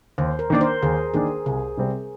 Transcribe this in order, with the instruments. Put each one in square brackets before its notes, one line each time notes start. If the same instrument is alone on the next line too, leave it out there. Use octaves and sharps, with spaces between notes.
[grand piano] D#2 [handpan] C5
[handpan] A#4
[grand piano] D#3 A#3 D4 [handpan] A#4
[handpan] C5
[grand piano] D#2 [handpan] G#4
[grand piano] D#3 A#3 D4 [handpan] G#4
[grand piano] C2 [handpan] G#4
[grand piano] C3 G3 C4